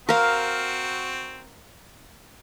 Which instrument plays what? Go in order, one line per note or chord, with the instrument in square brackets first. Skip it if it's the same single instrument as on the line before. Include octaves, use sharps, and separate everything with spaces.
[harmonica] C4 F#4 [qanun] A#4 F5